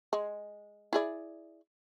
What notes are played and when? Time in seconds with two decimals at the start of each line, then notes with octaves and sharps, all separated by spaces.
0.13 G#3
0.93 E4 G#4 D5